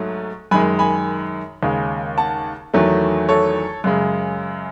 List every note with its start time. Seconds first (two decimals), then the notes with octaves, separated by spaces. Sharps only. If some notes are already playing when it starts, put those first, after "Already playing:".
Already playing: G#2 F#3 A3
0.51 F#2 D#3 G#3 G#5 B5
0.79 G#5 B5
1.63 D#2 C#3 G#3
2.18 F#5 A5
2.74 E2 D#3 F#3 A3
3.29 A4 C#5
3.84 F#2 C#3 G#3